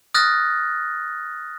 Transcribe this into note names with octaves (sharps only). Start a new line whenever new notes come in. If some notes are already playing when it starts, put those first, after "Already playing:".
D#6 F6 F#6 A6 A#6